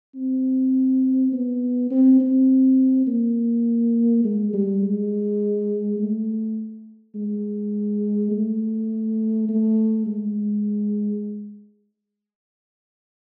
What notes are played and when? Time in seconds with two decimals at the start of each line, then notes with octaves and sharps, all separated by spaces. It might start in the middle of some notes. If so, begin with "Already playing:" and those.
0.15 C4
1.32 B3
1.90 C4
2.20 C4
3.07 A#3
4.24 G#3
4.53 G3
4.82 G#3
5.98 A3
7.15 G#3
8.31 A3
9.48 A3
10.06 G#3